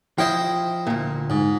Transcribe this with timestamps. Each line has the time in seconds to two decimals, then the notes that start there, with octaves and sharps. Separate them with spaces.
0.18 F3 E4 C5 D#5 G5
0.87 D2 A#2
1.30 G#2